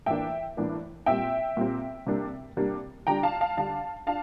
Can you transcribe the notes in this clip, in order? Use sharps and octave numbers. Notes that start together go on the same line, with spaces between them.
A2 E3 A#3 D4 E5 G5
A2 E3 A#3 D4
A#2 G3 C4 E5 G5
A#2 G3 C4
C3 G3 A#3 D4
C3 G3 A#3 D4
D3 G3 D4 G5 A#5
F5 A5
F5 A5
D3 G3 D4 F5 A5
D4 F5 A5